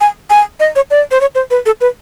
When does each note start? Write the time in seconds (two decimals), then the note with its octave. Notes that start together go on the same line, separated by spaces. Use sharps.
0.01 G#5
0.30 G#5
0.60 D#5
0.76 C#5
0.91 D5
1.11 C5
1.21 C#5
1.35 C5
1.51 B4
1.66 A4
1.81 B4